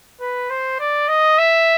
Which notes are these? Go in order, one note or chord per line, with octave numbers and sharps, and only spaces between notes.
B4
C5
D5
D#5
E5